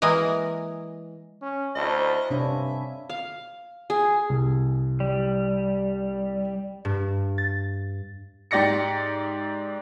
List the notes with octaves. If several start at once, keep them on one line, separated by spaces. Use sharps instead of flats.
E3 G#3 A#3 G#5
C#4
D2 E4 A4 C5 D#5
G2 C3 D4 E4 C#5 E5 F5 G#5
F5
G#4
C2
G3
G2
A6
G#2 G4 D5 A#6 C#7